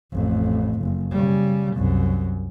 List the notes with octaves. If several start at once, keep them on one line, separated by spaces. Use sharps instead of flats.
A1 F2
F#1
C#3 G3
C2 F#2